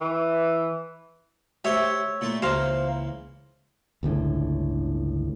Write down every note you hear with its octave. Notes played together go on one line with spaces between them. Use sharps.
E3
A3 G4 C5 C#5 E5
A#2 A3 F4
C#2 E3 A#3 C5 F5 A#5
G1 C#2 A2 D3